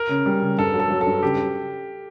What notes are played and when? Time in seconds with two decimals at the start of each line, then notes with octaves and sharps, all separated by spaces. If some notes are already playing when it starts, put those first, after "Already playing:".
Already playing: A#4
0.09 C#3
0.26 G3
0.42 C#3
0.58 G2 A4
0.74 F#3
0.80 A4
0.90 F#3
1.01 A4
1.07 G2
1.22 C#3 G4